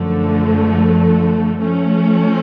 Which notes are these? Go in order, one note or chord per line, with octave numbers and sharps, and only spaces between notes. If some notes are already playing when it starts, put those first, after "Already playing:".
Already playing: F#2 D3 F3 A3
F3 A3 C#4